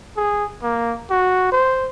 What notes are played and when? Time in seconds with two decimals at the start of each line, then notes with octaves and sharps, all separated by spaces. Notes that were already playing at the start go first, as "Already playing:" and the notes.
0.17 G#4
0.63 A#3
1.10 F#4
1.52 C5